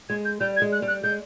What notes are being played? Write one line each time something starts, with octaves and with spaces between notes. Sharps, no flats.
G#3 G#6
G6
G3 G6
G#6
G#3
F#6
G3
F#6
G#3 G6